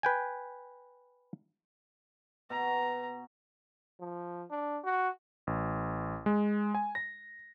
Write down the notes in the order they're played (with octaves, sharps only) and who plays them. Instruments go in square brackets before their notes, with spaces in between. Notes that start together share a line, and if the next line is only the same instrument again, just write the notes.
[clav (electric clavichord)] B4 G5 G#5
[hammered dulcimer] B2 [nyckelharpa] A#5
[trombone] F3
D4
F#4
[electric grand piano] A1
G#3
G#5
A#6